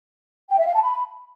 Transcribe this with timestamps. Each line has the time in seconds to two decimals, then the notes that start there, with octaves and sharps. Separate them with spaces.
0.50 G5
0.58 E5
0.66 F5
0.74 A5
0.82 B5